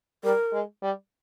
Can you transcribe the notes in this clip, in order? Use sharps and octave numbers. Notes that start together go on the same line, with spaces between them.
G3 A#4
G#3
G3